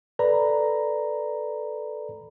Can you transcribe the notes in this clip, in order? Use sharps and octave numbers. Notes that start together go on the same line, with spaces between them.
A4 B4 D5 A#5 B5